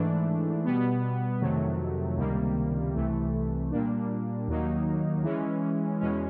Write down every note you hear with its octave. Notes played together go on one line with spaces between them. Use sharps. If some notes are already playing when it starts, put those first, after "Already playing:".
Already playing: G#2 E3 A3 D4
B2 G3 B3
F2 C3 D#3 F#3 A3
C#2 C3 D#3 G3 A#3
C2 C3 E3 A3
A#2 G3 A#3 D4
D#2 D#3 F#3 A#3 D#4
E3 G#3 C#4
E2 B2 G#3 C#4